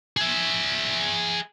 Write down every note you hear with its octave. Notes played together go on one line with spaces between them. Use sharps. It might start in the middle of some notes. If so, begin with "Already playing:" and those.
G#4 E5